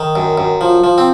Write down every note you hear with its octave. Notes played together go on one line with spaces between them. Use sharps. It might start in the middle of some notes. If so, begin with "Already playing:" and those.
Already playing: D#3
F#2
F#2
F3
F3
C4